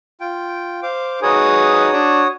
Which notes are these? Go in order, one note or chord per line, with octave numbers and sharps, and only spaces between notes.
F4 G5
C5 F5 D6
D#4 F#4 G#4 B4 C#5 D#6
D4